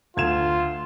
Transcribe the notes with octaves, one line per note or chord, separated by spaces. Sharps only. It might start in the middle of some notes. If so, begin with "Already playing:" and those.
D2 F4 G#6 E7